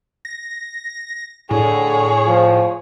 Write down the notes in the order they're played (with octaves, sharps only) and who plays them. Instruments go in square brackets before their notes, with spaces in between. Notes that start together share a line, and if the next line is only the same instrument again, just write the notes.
[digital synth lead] A#6
[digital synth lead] A2 [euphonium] D3 [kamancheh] G#4 C#5
[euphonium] F3